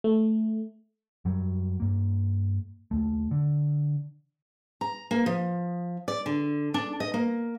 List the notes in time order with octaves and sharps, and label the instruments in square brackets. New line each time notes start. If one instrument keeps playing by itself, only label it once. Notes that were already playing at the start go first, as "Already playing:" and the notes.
[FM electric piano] A3
[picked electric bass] F#2 F#3 G3
G2 A#3
D#2 A3
D3
[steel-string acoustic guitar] A#5
A#3
F3
D5
D3
D4
D#5
A#3